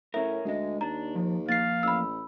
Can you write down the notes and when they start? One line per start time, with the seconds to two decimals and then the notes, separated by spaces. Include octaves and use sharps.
0.14 A2 C#4 A#4 E5
0.45 D2 G#3 D#5
0.81 D#2 D4 A#5
1.15 F3
1.49 F3 A#3 F5 A6 C7
1.83 A1 B5 E6